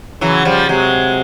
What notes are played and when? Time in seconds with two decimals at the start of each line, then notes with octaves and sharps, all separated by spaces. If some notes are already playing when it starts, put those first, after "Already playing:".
0.21 C#3 E3 F#3
0.45 F3 G3
0.69 C3 F#3 G#3